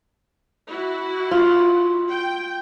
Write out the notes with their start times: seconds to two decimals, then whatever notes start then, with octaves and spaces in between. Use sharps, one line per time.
0.68 E4 F#4
1.31 F4
2.09 G5